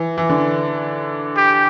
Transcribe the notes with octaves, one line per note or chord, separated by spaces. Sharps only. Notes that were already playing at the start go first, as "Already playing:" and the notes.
Already playing: E3
E3
D3
G4